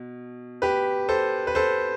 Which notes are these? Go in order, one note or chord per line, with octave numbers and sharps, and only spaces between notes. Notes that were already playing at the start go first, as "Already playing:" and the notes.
Already playing: B2
G4 B4
A4 C5
B4
A4 C5